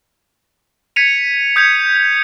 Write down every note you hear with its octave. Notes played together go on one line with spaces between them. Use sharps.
G#6 B6 C#7 D#7 F7
D#6 G6 G#6 C#7